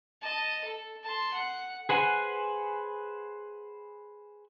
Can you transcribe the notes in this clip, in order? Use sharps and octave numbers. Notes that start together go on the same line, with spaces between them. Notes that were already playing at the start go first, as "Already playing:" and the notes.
D#5 A5
A4
A5 C6
F#5
G#4 B4 C5 F#5 G#5